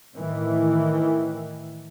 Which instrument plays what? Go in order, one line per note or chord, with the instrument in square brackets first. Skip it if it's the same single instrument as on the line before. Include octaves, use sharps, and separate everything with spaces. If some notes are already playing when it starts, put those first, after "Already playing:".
[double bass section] A2 D#3 E3